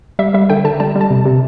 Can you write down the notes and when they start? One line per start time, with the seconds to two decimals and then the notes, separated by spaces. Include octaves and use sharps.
0.19 G3 E5
0.34 G3 E5
0.50 D3 G5
0.64 D3 A5
0.80 G3 A5
0.96 G3
1.01 A5
1.10 C3
1.26 C3